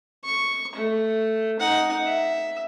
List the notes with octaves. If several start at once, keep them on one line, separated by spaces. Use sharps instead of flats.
C#6
A3
D#4 F#5
E5